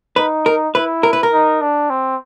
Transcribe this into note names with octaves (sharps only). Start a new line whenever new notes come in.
D#4 B4
A#4
E4 B4
A#4
B4
A#4
D#4
D4
C4